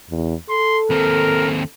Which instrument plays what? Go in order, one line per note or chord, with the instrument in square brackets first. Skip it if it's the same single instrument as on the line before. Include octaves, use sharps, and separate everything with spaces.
[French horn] E2
[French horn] A4 [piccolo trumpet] C6
[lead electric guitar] D#2 C4 [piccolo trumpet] A#4